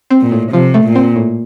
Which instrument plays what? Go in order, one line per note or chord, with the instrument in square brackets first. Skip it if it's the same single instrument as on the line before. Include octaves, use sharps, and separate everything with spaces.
[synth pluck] C4
[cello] A#2
[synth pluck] A2
[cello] C3 [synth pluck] F3
[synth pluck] A3
[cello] A#2
[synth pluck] C4
A2